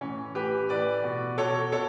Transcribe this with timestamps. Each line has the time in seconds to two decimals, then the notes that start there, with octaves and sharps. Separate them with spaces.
0.01 A2 E3 C#4
0.35 A2 E3 G4 B4
0.69 A2 E3 B4 D5
1.04 B2
1.38 B2 A4 C#5
1.72 B2 A4 C#5